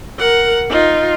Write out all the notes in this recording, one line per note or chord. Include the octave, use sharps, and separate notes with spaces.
A#4 F#5
D#4 F4